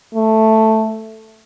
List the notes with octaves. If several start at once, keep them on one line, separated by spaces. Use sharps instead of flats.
A3